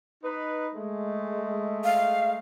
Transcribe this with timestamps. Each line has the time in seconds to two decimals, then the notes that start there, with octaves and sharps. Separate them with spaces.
0.24 D#4 B4
0.74 G#3 A3
1.84 F5